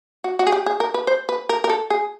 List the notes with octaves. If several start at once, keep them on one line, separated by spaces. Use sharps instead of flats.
F#4
F#4
G#4
G4
G#4
A#4
B4
C5
B4
A#4
A#4
A4
G#4